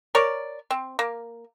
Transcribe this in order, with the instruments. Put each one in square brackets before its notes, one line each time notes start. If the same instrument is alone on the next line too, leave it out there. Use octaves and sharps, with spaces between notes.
[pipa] A#4 C#5 D5
C4
A#3